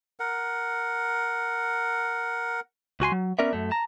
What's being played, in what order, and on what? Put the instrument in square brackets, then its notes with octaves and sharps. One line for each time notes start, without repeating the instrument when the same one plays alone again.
[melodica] A#4 F#5
[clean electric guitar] C#2 F#4 G#5 C6
F#3
B3 C#4 A#4 D5 E5
F#2 A3
A5 A#5